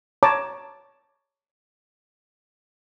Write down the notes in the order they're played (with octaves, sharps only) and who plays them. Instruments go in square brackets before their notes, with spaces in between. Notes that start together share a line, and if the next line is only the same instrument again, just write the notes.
[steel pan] C#5 A5 A#5 D6